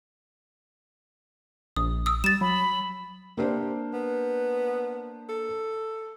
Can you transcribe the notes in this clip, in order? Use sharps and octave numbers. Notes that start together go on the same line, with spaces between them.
A#1 D#6
D#6 E6
G3 A6 E7
F#3 B5
C3 A#3 D4 C5
B3
A4